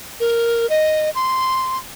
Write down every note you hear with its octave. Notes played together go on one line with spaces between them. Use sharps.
A#4
D#5
C6